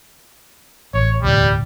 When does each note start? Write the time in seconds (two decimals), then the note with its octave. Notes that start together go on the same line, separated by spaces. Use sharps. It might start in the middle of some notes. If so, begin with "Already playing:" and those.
0.94 A1 C#5
1.23 E1 D2 A2 G3